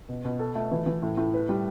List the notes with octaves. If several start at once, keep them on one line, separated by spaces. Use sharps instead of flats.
B2
B2
A4
A3
E3
E3
A2
A2
B4
G3